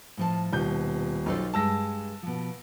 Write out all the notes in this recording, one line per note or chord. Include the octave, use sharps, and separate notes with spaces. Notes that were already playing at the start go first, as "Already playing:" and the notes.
A2 F3 A5
D#1 B2 G6
B1 F4 A4 C5
G2 G#3 A5 E6 A#6
B2 F3